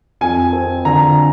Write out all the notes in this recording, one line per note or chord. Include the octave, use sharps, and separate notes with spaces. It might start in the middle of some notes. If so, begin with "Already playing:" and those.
F2 G#5
C4
D3 A#5